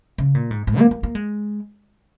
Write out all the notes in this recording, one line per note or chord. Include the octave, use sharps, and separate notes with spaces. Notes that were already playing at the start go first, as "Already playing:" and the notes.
C#3
A#2
G#2
G#2
A#3
A#3
A#3
G#3